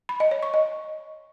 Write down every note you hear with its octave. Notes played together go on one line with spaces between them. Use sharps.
B5
D#5
C#5
C#6
D#5